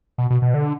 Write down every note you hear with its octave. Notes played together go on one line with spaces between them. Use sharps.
B2
B2
B2
D3